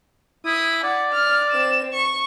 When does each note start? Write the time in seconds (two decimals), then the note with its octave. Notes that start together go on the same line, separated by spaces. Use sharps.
0.46 E4 D#6
0.84 D5 F#5
1.13 F6
1.52 C4 E7
1.93 C#6